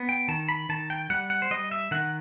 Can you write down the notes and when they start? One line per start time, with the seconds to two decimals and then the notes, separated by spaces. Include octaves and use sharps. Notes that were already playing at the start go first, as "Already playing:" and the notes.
Already playing: B3
0.09 G5
0.28 D#3 A5
0.49 B5
0.69 D#3 A5
0.90 G5
1.10 G3 F#5
1.30 F#5
1.42 C5
1.51 G3 D#5
1.71 E5
1.91 D#3 F#5